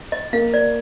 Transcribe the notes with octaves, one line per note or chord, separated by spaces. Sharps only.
D#5
A#3 F5
D5